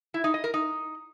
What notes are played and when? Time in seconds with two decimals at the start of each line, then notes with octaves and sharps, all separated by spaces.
0.14 E4
0.24 D#4
0.34 D#5
0.44 A#4
0.54 D#4